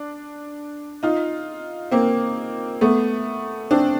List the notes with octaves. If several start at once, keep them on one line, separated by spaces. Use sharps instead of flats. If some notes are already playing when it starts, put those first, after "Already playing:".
Already playing: D4
D#4 F4
A#3 C4
A3 B3
C4 D4